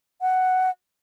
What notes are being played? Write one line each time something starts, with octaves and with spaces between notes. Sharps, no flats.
F#5